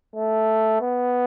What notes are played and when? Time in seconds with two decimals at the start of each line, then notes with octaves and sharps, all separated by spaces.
0.16 A3
0.81 B3